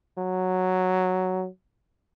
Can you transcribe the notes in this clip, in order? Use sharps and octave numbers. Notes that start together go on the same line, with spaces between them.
F#3